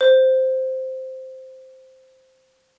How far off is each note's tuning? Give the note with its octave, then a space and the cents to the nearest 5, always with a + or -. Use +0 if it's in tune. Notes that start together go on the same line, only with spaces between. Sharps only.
C5 -5